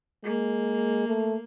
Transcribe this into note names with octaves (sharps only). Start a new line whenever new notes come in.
G#3 A#3
A3